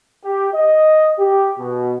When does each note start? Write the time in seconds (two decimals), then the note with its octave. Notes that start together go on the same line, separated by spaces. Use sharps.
0.24 G4
0.54 D#5
1.19 G4
1.59 B2